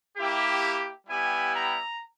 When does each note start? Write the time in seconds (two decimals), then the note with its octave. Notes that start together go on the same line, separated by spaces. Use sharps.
0.16 A#3 E4 G4
1.07 G3 B3 E4 G4 G#5
1.53 A#5